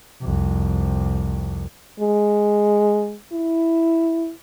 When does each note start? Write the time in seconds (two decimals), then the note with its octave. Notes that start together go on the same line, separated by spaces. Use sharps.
0.22 C2 F2
2.00 G#3
3.32 E4